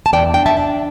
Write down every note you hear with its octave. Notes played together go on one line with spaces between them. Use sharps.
A5
E2 D5 G5
D4 G5
E5 A5
D4